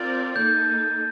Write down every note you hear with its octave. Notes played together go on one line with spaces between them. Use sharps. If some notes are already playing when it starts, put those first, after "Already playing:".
Already playing: C4 F4 A#4 D5 A6
A#3 D#4 A4 G6